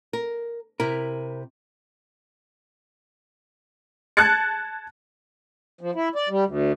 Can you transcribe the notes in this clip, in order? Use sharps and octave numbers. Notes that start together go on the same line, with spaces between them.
A#4
C3 E4 A#4
A5 F#6 G#6 A6 C#7
F3
E4
D5
G3
D2